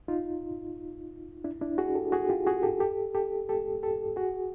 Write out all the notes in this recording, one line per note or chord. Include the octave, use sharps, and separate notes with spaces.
D#4 F4
D4 E4
D4 E4
F#4 G#4
G4 A4
F#4 G#4
F4 G4
F#4 G#4
G4 A4
G4 A4
G4 A4
G4 A4
G4 A4
F#4 G#4